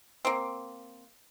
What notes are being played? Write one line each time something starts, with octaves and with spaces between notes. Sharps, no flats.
A#3 C4